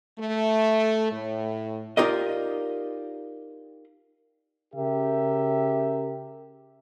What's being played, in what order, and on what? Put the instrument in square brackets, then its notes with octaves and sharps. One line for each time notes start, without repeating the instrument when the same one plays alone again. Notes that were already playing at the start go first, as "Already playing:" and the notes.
[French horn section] A3
A2
[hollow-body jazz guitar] D#4 F4 G4 A#4 D5 D#5
[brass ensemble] C#3 G4 A#4 E5